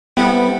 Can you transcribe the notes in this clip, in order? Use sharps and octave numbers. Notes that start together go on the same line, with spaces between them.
G3 B3 C4 E4 A4 C5